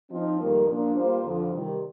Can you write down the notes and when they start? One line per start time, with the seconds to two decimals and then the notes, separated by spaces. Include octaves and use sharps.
0.10 F3 C4 D#4
0.39 F2 D#3 G3 A#3
0.67 A#2 F3 A#3 D4
0.95 G3 A#3 F4 C5
1.23 F2 D3 F3
1.51 C3 D#3 G3